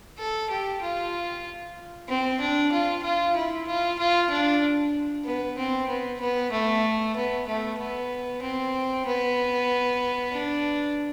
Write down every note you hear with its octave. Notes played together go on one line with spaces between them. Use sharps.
A4
G4
F4
C4
D4
F4
F4
E4
F4
F4
D4
B3
C4
B3
B3
A3
B3
A3
B3
C4
B3
D4